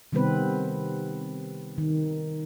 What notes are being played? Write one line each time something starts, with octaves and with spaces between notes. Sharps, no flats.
C3 D#3 G3 B3 C4 B4
D#3